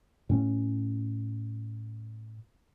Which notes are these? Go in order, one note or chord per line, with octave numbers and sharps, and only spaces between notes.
A2 C#4